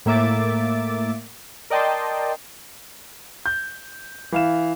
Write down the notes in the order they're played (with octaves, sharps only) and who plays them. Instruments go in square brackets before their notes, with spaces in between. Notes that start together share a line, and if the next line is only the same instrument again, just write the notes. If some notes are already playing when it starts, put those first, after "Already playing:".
[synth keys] A2 A#3 E5 D6 A6
A#4 D5 D#5 G5 A5 C6
[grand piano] G6
E3 F5 E7